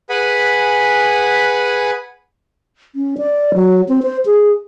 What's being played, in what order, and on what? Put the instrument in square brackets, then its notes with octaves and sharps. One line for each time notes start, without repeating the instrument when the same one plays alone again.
[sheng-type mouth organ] G#4 B4 F#5 G#5 B5
[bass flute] C#4
D5
F#3
C4
C5
G#4